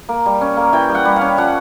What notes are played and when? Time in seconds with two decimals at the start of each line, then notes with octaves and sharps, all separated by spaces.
0.09 A#3
0.26 G3
0.41 C#4
0.57 A#3
0.73 E3 G5
0.89 G3
0.95 F#5
1.05 G3
1.16 F5
1.21 C#4
1.37 F3 F#5